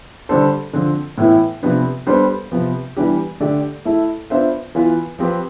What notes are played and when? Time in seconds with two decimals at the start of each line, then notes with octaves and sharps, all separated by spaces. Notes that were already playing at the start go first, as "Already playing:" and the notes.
0.29 D3 G3 D4 A4 C5
0.73 D3 F3 C4
1.18 A2 E3 B3 E4
1.63 C3 F3 B3 D4
2.07 G3 B3 D4 A4 C5
2.51 C3 F3 B3
2.96 E3 G3 B3 D4 G4
3.40 D3 A3 D4 G4 D5
3.85 A3 E4 A4
4.30 B3 D4 F4 C5 E5
4.75 E3 B3 F4 B4
5.19 F3 C4 G4 B4